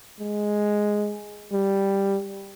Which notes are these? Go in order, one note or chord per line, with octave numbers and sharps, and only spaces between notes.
G#3
G3